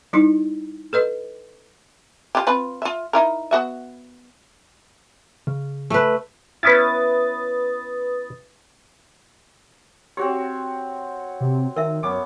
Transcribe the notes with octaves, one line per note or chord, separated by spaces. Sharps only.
G3 D#4 E4
A4 B4 D#5
F4 G4
C4 F4 B4
F4 E5
D#4 E4 A#4
B3 F#4 E5
C#3
A3 B4
B3 C#4 E4 B4 D#6 A6
C4 F#4 G4 C#5
C3
D#3 A#4 E5
F#2 B3 C#4 D6